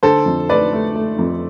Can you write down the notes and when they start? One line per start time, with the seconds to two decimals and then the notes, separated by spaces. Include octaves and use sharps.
0.03 D3 A4 C5
0.26 F2
0.49 A3 B4 D5
0.73 A3
0.96 A3
1.19 F2